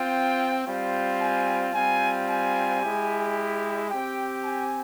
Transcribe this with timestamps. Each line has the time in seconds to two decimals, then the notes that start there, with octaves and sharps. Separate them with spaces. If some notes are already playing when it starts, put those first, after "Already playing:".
Already playing: C4 F4 G5
0.66 G3 C4 F4
1.20 G#5
1.74 G3 C4 F4 G#5
2.29 G#5
2.82 G#3 E4 G4
3.89 C4 G4 G5
4.44 G#5